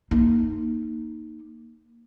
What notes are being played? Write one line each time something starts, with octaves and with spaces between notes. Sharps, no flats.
A#3 D#4